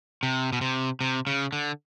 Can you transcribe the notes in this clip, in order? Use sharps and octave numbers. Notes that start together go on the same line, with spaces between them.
C3
B2
C3
C3
C#3
D3